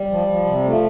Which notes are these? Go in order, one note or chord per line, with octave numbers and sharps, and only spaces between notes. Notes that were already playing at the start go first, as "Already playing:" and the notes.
Already playing: G3
F3
F3
C3
F3 A3